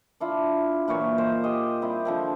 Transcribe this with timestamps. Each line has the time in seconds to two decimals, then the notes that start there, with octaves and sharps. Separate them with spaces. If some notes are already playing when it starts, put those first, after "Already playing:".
0.20 D4 E4 F4
0.88 A#2 E3 F#3 C#5
1.18 C5 D#5
1.44 G4 G#4 D#5
1.82 G3 C4 E4
2.05 D3 F3 C4